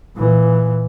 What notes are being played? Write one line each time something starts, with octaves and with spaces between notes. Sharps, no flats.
A#2 E3